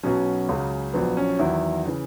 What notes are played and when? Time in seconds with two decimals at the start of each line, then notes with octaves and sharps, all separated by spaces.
0.03 B1 B2 F#3 C#4
0.49 C#2 C#3 F#3
0.93 A#1 A#2 F#3 B3
1.17 C#4
1.39 E2 D#3 F#3 E4
1.86 C#3 E3